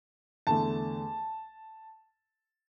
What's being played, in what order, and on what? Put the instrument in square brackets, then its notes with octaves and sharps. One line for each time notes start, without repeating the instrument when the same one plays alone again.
[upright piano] E2 D3 A3 A5